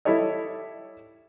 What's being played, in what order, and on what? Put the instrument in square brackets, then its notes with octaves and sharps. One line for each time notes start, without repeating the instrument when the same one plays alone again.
[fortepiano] G3 E4 A4 C#5 D#5